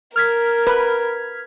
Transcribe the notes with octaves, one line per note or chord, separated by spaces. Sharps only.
A#4 F6 G#6 B6
B4